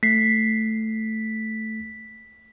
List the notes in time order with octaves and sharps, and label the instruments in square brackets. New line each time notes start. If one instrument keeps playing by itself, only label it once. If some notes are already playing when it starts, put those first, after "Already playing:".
[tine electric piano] A3 C7 [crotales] B6